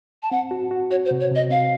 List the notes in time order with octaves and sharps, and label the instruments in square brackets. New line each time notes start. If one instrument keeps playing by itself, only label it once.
[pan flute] A5
[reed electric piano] C4 [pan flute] F#5
[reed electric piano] F#4
F#4
[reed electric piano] F#4 [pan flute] C#5
[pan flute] C5
[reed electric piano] C3
[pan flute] C#5
[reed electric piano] C3 [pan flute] D#5
[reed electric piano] C4 [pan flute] F5